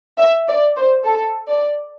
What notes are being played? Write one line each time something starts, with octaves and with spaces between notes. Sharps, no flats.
E5
D5
C5
A4
D5